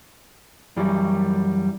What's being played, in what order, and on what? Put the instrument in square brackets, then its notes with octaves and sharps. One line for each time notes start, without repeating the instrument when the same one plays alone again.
[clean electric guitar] F#2 E3 G3